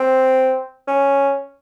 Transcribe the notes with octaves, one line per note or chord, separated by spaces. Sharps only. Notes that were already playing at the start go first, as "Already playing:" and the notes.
Already playing: C4
C#4